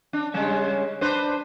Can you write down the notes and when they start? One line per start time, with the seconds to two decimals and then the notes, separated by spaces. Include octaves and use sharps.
0.13 D4
0.34 C#3 G3 G#3
1.01 D4 B4 C5